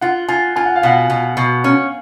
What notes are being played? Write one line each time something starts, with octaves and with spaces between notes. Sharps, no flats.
F4 F#5
F4 G#5
F4 G#5
F#5
F5
B2 F#5
B2
B2
C#4